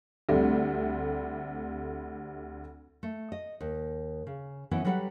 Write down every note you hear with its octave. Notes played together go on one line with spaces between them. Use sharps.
D2 G3 A3 C4
A3
D#5
D#2
C#3
E3 F#3 B3 C#4 E4
F#3 G3 A4 B4 D#5 F#5